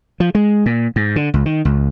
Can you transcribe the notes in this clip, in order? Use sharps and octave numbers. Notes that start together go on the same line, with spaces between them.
F3
G#3
A#2
G#2
D3
C#2
D#3
C#2